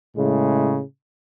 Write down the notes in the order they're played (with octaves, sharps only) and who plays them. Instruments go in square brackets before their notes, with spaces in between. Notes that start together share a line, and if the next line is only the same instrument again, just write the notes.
[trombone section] A2 C#3 G#3